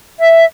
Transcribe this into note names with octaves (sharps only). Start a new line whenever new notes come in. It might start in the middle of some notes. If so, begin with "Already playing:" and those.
E5